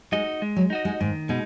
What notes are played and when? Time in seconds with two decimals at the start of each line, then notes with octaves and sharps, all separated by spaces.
0.12 G#3 D#4 F#4 D#5
0.42 G#3
0.56 F#3
0.70 D#4 F#4 D#5
0.85 G#3
1.00 G#2 D#3
1.29 B2 G#3 D#4